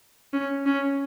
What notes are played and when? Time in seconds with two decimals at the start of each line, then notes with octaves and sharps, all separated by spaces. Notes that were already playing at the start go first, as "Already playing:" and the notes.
0.33 C#4
0.66 C#4